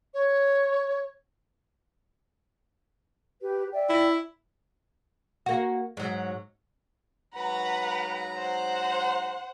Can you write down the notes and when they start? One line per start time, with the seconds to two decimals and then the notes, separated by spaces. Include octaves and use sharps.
0.14 C#5
3.40 G4 B4
3.73 D5 E5 G5
3.89 E4
5.46 A#3 F#4
5.97 G#2 F#3
7.34 G#2 F#3 B4 F#5 A#5
8.37 C5 F#5